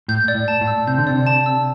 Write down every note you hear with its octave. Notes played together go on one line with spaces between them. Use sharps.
A2 G6
D5
A2
A5
A2
E6
C3 G6
D3
C3 D5
A5
E6